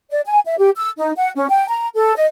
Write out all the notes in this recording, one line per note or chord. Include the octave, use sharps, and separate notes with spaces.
D5
G#5
E5
G4
E6
D#4
F#5
C#4
G5
A#5
A4
D#5